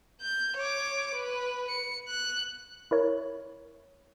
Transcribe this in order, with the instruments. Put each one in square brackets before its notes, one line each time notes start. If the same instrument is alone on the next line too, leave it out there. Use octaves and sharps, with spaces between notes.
[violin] G6
C#5 D6
B4
C#7
F#6
[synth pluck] E4 A#4 C#5